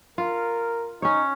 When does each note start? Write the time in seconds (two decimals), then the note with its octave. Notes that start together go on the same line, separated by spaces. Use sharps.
0.18 F4 A#4
1.02 C#4 D#4 C#5